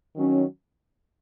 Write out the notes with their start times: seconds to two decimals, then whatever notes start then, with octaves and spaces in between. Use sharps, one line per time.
0.15 D#3 F#3 C#4